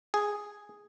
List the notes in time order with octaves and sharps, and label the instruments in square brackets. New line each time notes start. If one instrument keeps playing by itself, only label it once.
[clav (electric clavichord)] G#4